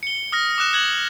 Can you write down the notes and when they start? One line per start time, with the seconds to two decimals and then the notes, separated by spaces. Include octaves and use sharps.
0.03 C#7 G7
0.32 D#6 F6 A#6
0.58 D6 D#6 F#6 E7
0.73 F#6 G#6 F#7